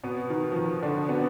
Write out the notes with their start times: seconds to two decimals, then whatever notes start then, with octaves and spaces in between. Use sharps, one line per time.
0.04 B2 B3
0.30 D#3
0.52 F3
0.56 D#3
0.83 D3 D4
1.09 B2 B3